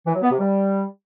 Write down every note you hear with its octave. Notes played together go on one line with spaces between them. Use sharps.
E3
F#3
B3
C3
G3